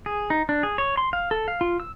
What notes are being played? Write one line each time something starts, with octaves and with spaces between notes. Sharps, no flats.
G#4
D#4
D4
G#4
C#5
C6
F5
A4
F5
F4
E6